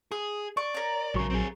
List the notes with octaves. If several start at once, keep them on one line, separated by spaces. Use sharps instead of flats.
G#4 D#6
D5 C#6
A#4 C#5
A#1 G#2 C#3 F#3 C#6
C4 G#4